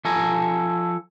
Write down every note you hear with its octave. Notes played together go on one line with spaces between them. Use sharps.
F3 A4 G#5 A#5